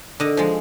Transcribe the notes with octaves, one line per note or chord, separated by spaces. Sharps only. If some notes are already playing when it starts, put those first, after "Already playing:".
D3 D#5
F3 G#3